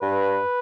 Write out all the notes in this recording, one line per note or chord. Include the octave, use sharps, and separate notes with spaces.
G2 B4